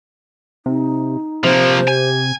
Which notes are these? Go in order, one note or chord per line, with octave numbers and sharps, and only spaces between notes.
C3 D#4
C3 F3 A#3 C5
G4 G#5